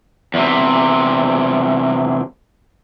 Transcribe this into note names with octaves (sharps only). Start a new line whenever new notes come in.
E2 C3